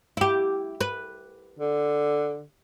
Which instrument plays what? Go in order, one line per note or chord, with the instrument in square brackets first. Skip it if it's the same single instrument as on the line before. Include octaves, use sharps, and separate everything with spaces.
[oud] E4 G4
B4
[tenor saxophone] D3